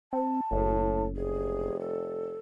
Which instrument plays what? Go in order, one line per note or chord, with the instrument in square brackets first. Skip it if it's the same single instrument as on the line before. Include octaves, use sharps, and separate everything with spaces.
[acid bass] C4 [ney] A5
[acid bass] F#1 [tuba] A2
[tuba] F1 [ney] G#4
[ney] A4